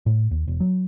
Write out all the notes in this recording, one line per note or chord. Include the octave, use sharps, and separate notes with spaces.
A2
D#2
E1
F#3